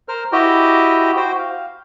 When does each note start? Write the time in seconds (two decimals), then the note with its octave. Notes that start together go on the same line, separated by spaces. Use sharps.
0.08 A#4 C5 F6
0.32 E4 F#4 G4 D#5 G5
1.16 F#4 C5 G5
1.39 F5